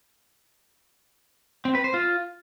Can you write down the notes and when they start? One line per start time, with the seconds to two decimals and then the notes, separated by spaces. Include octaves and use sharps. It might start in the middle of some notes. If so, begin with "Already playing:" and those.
1.65 C4
1.75 B4
1.84 C5
1.94 F4